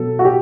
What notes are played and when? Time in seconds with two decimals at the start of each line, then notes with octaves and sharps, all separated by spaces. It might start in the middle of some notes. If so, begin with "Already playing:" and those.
Already playing: B2 F#3 A4
0.19 F#4
0.25 G4